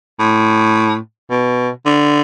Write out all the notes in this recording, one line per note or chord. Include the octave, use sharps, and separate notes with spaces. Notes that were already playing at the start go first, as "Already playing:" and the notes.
A2
B2
D3